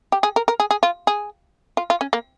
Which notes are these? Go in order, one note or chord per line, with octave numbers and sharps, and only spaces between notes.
G4
G#4
A#4
A#4
G#4
G#4
F4
G#4
F4
F4
C#4
A#3